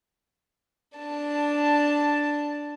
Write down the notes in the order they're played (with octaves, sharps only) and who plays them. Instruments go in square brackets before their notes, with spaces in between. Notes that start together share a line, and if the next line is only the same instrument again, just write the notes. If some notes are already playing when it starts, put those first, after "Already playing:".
[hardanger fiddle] D4 A5